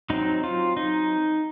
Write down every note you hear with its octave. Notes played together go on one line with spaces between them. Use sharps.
F#3 C4 D#4
F4
D#4